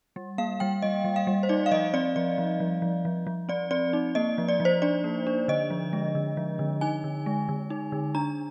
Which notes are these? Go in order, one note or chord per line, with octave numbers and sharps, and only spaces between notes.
G3
A#3 F5
G3 G5
G3 D#5
G3
F5
G3
C5
D#4 D5
F5
F3 D#5
C4 D5
F3 D5
F3
F3
F3
F3
F3
C4 D5
C4 D5
D#4
A#3 D#5
F3
D5
F3
C5
D4 D5
A#3
D4
D3 D#5
F3
G#3
D3
F3
D3
D#4 G#5
D3
G#3
D3
D#4
D3
D4 A#5